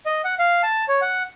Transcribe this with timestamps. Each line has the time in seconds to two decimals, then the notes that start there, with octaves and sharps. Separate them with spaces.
0.06 D#5
0.24 F#5
0.39 F5
0.63 A5
0.88 C#5
1.02 F#5